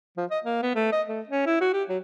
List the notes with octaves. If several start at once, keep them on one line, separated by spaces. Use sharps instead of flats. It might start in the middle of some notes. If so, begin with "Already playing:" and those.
F3
D#5
A#3
B3
A3
D#5
A3
C#4
E4
F#4
G4
F#3